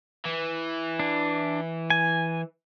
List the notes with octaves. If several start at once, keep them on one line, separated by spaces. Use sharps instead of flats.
E3
D4
G#5